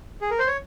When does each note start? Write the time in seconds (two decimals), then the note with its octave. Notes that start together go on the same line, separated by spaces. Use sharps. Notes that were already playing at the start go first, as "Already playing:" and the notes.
0.21 G#4
0.31 A#4
0.39 C5
0.47 C#5